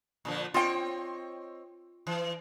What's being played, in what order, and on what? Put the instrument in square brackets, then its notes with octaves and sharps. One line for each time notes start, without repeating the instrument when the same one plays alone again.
[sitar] A#2 D3 F3
[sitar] C4 C#5 D#5 [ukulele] F4 G5
[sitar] E3